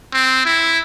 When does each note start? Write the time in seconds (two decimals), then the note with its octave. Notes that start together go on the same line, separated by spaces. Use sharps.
0.13 C4
0.46 E4